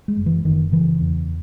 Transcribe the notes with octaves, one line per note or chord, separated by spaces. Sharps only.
G#3
F#1
E3
F#1 D#3
C#3 E3
E2